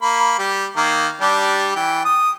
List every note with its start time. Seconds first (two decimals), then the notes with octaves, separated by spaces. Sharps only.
0.02 A#3 B5
0.39 G3 G4
0.76 D#3 A#3
1.21 G3 D4 G4
1.76 E3 G5
2.05 D#6